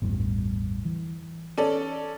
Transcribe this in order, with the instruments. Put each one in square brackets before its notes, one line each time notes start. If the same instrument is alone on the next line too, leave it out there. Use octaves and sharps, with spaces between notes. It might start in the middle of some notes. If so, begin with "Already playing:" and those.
[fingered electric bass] A1 E2 G2
E3
[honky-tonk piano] C#4 A4 D5